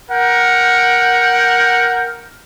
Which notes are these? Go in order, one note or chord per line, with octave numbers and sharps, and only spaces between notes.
A#4 F#5 G5